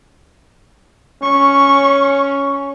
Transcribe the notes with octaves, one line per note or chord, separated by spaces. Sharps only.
C#4 C#6